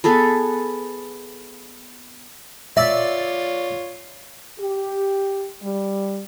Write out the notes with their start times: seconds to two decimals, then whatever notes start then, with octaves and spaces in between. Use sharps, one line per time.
0.04 B3 G#4 A4 B4
2.77 F4 C#5 D5 E5
4.59 G4
5.63 G3